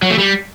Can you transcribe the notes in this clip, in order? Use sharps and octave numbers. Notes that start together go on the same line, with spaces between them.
F#3
A3
G3